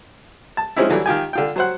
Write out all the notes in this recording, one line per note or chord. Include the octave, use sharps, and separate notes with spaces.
A5
F3 G#3 C4 C#4 D#4 E4
D3 E3 F#3 G3
D#3 F4 G4 G#5
D3 F4 G5
F#3 C5 F#5